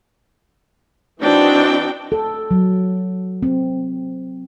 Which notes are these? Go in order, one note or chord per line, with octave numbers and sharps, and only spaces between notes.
E3 C4 D4 D#4 F#4 G5
A4
F#3
C4